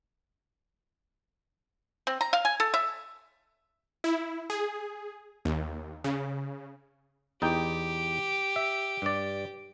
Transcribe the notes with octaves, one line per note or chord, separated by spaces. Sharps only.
C4
A#5
F5
G#5
A4
E5
E4
G#4
D#2
C#3
E2 D#4 G4 G5
E5
G2 D5